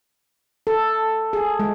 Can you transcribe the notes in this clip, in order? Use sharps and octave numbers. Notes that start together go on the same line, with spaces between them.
A4
G#4
G#3